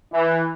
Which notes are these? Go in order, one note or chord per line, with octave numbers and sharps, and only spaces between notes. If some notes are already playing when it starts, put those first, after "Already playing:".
E3